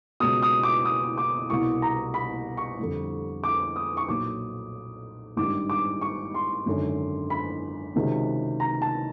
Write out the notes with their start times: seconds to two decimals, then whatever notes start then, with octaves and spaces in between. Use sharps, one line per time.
0.20 C#2 B2 F#3 D#6
0.42 D#6
0.63 D6
0.85 D#6
1.18 D6
1.50 C2 B2 G3 C#6
1.82 A#5
2.14 B5
2.57 C#6
2.78 F2 D3 G3
3.44 D6
3.76 D#6
3.97 C#6
4.08 B1 A#2 F#3 D6
5.37 G#1 G2 D#3 G3 D6
5.70 D6
6.01 C#6
6.34 C6
6.66 G#1 F#2 D3 F#3
7.30 B5
7.96 C#2 C3 D#3 F#3
8.60 A#5
8.82 A5